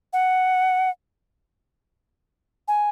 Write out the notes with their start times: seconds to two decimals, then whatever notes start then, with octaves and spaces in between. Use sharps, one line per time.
0.13 F#5
2.68 G#5